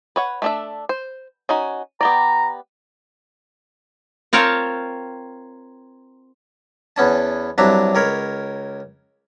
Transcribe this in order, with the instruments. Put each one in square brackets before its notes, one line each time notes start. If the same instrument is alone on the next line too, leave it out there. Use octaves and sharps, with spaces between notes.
[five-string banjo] B4 C#5 F#5
A3 D4 E5
C5
C#4 D#4 F#4
[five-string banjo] B3 G4 D5 [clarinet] A#5
[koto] C4 F4 A#4 C#5 G5 A5
[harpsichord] E2 B3 C#4 A5
C2 F#3 D4 B4 E5 A#5
C#2 A#4 C#5 B5